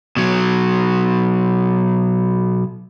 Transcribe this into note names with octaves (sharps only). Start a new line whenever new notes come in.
B2 F#3